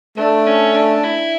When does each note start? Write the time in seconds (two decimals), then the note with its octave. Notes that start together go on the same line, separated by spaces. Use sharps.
0.17 A3 D4
0.46 C#4
0.74 D4
1.03 E4